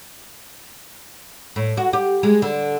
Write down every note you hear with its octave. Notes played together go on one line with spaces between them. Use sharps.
A2
F#4
G4
G#3
D3